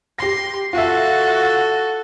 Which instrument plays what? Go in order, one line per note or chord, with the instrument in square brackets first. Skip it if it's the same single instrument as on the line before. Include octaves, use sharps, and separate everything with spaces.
[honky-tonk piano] G4 A#6 [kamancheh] C6
[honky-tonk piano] F4 E5 [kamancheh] F#4 A4